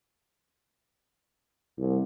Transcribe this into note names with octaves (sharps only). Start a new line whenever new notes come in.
C2